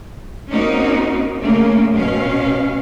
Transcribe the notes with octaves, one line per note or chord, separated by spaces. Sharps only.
A#3 C4 C#4 D#4 F#4 A#4
C#3 A3 A#3
B2 C#4 F5